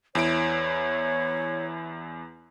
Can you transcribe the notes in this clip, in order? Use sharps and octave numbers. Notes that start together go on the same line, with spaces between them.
E2 E4 C#5 D7